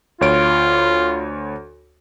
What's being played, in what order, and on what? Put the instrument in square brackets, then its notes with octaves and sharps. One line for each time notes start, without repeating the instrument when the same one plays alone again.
[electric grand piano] D2 C#5 D7 [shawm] F4